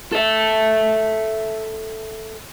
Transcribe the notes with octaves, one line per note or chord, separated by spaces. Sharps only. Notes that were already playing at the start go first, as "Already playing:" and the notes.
A4 E5